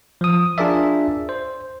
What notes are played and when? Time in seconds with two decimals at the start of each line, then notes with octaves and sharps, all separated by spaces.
0.21 F3 D#6
0.58 D4 F4 G#4 A#4 D5 E5
1.29 C5